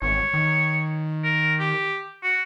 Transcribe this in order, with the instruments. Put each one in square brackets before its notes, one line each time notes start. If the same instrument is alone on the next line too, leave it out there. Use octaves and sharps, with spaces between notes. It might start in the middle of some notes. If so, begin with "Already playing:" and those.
[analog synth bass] G#1 [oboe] C#5
[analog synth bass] D#3
[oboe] A#4
G4
F#4